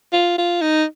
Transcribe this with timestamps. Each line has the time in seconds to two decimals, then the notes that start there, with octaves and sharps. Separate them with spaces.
0.13 F4
0.38 F4
0.62 D#4